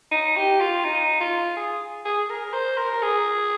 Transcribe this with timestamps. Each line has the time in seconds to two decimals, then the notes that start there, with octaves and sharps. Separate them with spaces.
0.11 D#4
0.36 G4
0.60 F4
0.85 D#4
1.21 F4
1.57 G#4
2.05 G#4
2.30 A#4
2.53 C5
2.78 A#4
3.02 G#4